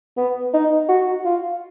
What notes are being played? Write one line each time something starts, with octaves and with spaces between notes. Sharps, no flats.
B3
D#4
F#4
F4